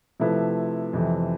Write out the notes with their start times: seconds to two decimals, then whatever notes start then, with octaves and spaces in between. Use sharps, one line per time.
0.20 C3 F3 A3 E4 B4
0.93 F2 C3 E3